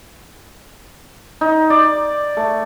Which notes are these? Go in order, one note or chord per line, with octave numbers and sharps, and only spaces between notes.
D#4
D5
A3